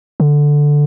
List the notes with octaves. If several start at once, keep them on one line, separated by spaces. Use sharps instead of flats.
D3